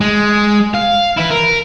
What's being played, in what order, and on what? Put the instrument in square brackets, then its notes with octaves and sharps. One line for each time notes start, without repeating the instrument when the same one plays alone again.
[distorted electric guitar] G#3
F5
E4 B4
A#4